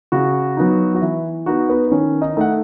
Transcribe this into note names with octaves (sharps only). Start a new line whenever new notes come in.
C#3 F#4
F#3 B3 D#4
F#4
E3 E4
B3 D#4 F#4
B3 B4
B4
D#3 C#4 C#5
D#4 D#5
A3 D#4 F#5